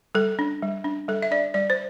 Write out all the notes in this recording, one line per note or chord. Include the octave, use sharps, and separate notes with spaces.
G3 A4
D4
G3
D4
G3 A4
E5
D4 D5
G3 D5
C5